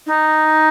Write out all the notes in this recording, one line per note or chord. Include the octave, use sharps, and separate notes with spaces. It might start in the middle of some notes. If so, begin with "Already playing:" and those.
D#4